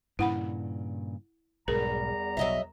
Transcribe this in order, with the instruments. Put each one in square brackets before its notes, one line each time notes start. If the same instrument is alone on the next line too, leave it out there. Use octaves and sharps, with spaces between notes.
[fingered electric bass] G2 A#2 C#3 [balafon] E4 F#5 B5
[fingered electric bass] B1 G#2 B2 [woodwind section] E2 G3 A#5 [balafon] G#4 A#4
[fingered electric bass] B1 B2 [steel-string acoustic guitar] F#3 D#5 E5